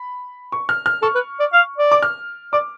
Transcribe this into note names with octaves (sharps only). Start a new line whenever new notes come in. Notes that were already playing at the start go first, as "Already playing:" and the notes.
Already playing: B5
C#6
F6
F6
A4 C#6
B4
D5
F5
D5
D6
F6
D5 D6